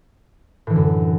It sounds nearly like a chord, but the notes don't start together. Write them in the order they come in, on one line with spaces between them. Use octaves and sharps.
A2 E3 D3 F#2